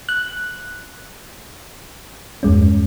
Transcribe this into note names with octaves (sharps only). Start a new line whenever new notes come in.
F#6
E2 G2 G#3 C#4